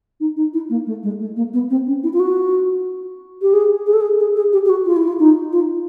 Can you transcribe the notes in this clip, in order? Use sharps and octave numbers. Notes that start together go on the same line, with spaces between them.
D#4
D#4
E4
A#3
A3
G#3
A3
A#3
B3
C4
C#4
E4
F4
F#4
G4
G#4
G#4
A4
G#4
G#4
G#4
G4
G4
F#4
F4
E4
F4
D#4
F4